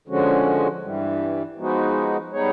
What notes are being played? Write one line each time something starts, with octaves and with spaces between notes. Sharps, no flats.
D3 F3 G#3 C#4 F#4
G2 E3 G3
F3 G#3 B3 D#4 F#4
G3 B3 D#4 G#4 C#5